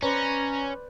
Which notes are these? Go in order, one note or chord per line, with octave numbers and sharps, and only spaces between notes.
C#4 B4 C5 D5 A#5